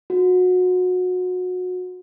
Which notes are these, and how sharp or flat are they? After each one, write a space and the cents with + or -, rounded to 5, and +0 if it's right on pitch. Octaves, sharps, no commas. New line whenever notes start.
F#4 -25